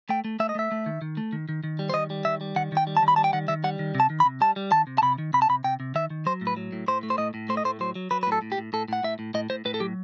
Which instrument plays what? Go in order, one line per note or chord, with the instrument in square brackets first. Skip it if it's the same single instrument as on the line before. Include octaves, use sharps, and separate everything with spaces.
[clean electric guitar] A3 G5
A3
A3 E5
D#5
A3 E5
A3
D#3
D#3
A3
D#3
D#3
D#3
G3
C5
D#3 D#5
G3
D#3 E5
G3
D#3 F#5
D#3 G5
G3
A5
D#3
B5
G3 A5
G5
D#3 F#5
D#3 E5
G3 F#5
D#3
C3
A5
D#3
B5
C3
G3 A5
G3
D#3 A5
C3
A5
C3 B5
D#3
C3 B5
A5
C3 B5
C3 G5
C3
D#3 E5
D#3
F#3 C5
A2
B4
F#3
A2
A2 C5
A3
C5
A2 D#5
A2
A3 C5
D#5
A2 C5
F#3 C5
F#3
F#3 B4
B4
A2
A4
A2
G4
A2
A2 A4
A2 F#5
A2 E5
A2
A2 D#5
A2 C5
A2 B4
A4
F#3 G4